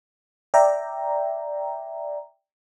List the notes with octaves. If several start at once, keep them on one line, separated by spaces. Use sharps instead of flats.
D5 E5 G5 A#5